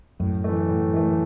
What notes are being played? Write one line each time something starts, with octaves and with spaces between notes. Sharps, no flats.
F#2 A2
E3 A3
A2
E3 A3